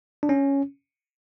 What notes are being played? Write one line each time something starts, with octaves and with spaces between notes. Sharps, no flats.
D4
C#4